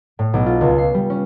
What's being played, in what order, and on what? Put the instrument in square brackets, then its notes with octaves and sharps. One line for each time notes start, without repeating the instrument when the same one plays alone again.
[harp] A2
B1
F4
C#2
C7
G3
C#4